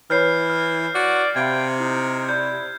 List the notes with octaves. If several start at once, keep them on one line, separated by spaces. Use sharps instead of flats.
E3 B4 C#5 B5 F6 G6 C7
F6
F#4 D5
C3 E5 F5 G5 B5 G#6
D#4 E4
E4 D5 B5 G6